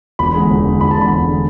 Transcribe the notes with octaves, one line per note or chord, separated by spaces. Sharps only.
E1 B5
E2 D3 G#3
E1
E2 D3 G#3
E1 B5
A5
E2 D3 G#3 B5
E1
D3 G#3